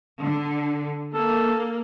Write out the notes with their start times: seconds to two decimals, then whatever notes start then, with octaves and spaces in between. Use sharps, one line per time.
0.21 D3
1.14 A#3 A4